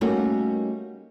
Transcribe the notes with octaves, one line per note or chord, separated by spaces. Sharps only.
G3 A3 A#3 C#4 D#4 F#4